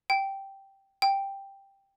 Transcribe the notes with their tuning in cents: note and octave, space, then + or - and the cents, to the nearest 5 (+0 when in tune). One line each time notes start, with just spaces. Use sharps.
G5 -5
G5 +5